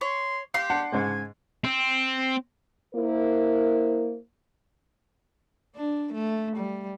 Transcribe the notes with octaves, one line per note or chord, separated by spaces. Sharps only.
C#5 C6
G4 F5 C6
D4 F#5 A5
G#2 C#3 G#3 G#5
C4
A#3 E4 A#4 C5
D4
A3
G3